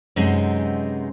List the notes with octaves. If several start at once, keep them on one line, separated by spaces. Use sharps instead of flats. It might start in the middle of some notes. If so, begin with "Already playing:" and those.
F#2 C3 G#3 B3 C4 D#4